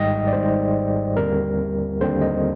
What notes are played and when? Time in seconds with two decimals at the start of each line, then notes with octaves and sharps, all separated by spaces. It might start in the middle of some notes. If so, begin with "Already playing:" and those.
Already playing: G#1 G#2 G3 D#5 G5
0.27 D5
0.32 G#1 G#2 G3 C5
1.17 D#2 D3 G3 C4 A#4
2.01 D#2 D3 G3 C4 C5
2.22 D#5